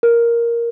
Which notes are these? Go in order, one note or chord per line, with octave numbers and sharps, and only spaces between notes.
A#4